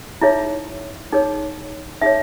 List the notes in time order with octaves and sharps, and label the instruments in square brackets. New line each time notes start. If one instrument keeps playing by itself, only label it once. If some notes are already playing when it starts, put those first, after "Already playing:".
[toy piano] D#4 E4 G#4 C#5 E5
D#4 G#4 C#5
D#4 G#4 C#5 E5